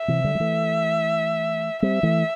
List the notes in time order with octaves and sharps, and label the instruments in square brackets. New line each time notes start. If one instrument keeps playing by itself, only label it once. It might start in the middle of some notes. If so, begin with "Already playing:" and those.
Already playing: [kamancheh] E5
[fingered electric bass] C3 E3
D3 G3
G3
E3 A3
[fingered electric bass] G3 C4 [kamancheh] E5
[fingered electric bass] E3 A3